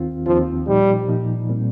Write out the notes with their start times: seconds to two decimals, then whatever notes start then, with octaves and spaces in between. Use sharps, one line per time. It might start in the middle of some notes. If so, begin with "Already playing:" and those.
Already playing: D#2 D#3 C4 F4
0.26 D#2 D#3 F3 C4 F4
0.67 A#2 F3 G3 D#4
1.08 A#2 F3 D#4
1.49 A#2 G3 C4